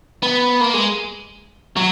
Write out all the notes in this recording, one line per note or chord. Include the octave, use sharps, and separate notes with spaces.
B3
A#3
G#3
F#3